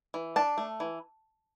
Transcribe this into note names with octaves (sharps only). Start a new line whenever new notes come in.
E3
D4 A5
A3
E3